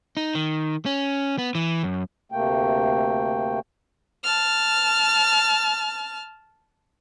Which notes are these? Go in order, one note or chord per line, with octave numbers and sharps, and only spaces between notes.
D#4
D#3
C#4
B3
E3
F#2
D2 C3 A3 A#3 G5
A5 F6